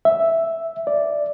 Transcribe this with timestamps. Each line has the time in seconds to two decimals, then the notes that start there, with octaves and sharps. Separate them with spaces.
0.05 E5
0.87 D5